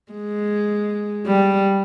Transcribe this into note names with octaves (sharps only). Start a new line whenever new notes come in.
G#3
G3